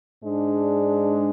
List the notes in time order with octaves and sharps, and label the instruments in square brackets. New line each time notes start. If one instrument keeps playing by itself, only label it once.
[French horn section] G#2 G#3 D4